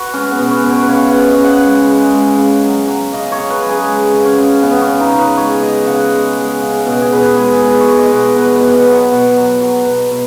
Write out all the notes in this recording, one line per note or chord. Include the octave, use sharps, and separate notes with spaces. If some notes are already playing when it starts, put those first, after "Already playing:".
Already playing: F#4 B4
G#3 C#4
B3
B2
C#4
B2
C#5
B4
C#3 C#5
F#5
C#3
D#5
C#3
F#5
G#3
G#3
G#3
C#3
F#3
F#3
C#3 D#5
C#5
C#3
B4
F#3
G#4
G#3
C#3
C#4
C#3
C#3 B3
C#4
C#3
D#4
C#3
B4
G#3 C#5
C#3 D#5
C#3 F#5
G#3
G#3
C#3
B2 D#5
G#4
B2 B4
G#3 G#4
G#3 B4
C#5
G#3
D#5
B2
B2 B4
B4
B2
F#5
F#3
F#5
B2
F#3
F#3
B2
B2